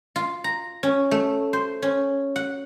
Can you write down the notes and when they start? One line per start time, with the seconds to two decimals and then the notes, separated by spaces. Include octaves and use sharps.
0.16 F4
0.44 A#5
0.83 C#4
1.11 A3
1.53 C5
1.82 C#4
2.36 F#5